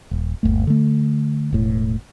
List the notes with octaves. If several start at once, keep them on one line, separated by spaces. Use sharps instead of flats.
D#1
G1 D#2 A3
D3 A3
E1 A2